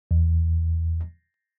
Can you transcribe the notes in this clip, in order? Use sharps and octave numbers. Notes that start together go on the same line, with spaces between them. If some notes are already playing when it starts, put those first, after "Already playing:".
E2